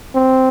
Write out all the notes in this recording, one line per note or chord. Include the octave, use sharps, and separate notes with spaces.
C4